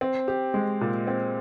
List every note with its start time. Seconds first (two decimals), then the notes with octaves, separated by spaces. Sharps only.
0.01 C4
0.28 G4
0.54 G#3
0.81 A#2
1.07 C4